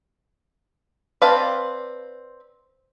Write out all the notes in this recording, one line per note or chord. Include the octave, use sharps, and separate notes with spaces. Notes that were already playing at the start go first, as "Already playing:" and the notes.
C4 B4 D5 F5 A5